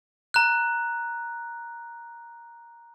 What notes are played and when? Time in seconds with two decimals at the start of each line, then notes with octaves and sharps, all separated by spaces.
0.34 A#5 F#6